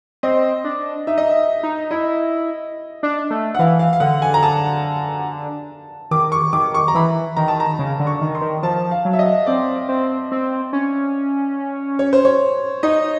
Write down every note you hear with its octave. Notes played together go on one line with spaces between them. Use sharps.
C4 D#5
D4
D#4 E5
D#5
E5
D#4
E4 D#5
D4
A3
F#5
E3 F5
F5
F5
D3 F#5
G#5
A#5
A5
D#3 D6
C#6
D#3 D6
C#6
A#5
E3 B5
D#3 A#5
A5
A#5
C#3
D3
C#6
D#3
C6
D#3
F3 A5
F5
F#3
E5
D#5
C4 D5
C4
C4
C#4
C#5
C5
C#5
D#4 D#5